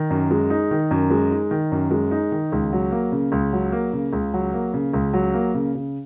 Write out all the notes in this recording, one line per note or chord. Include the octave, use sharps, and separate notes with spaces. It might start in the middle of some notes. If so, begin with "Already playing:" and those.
Already playing: D#3
F#2
G#3
D#4
D#3
F#2
G#3
D#4
D#3
F#2
G#3
D#4
D#3
C#2
F#3
A#3
C#3
C#2
F#3
A#3
C#3
C#2
F#3
A#3
C#3
C#2
F#3
A#3
C#3
C#3